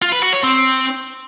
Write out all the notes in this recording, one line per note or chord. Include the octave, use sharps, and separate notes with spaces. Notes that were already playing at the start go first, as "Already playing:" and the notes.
F4
B4
F#4
C#5
C4